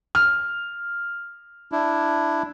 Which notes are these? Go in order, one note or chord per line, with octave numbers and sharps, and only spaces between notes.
F6
D4 E4